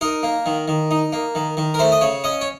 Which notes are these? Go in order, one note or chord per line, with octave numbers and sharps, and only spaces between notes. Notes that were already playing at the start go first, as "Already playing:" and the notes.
D#4 A#4
A#3
D#3
D#3
D#4
A#3
D#3
D#3
A#4
A3 C5
D#5
C#3 C#5
C#4 D#5
C#5